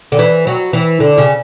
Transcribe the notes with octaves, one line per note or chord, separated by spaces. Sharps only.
D3
E3
F#3
E3
D3
C#3